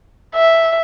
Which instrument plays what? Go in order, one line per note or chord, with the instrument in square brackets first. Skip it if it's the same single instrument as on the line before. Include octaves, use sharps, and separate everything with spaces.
[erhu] E5